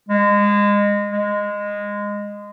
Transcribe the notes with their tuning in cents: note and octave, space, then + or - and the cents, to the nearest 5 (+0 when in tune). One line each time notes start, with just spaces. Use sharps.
G#3 -25
G#3 -15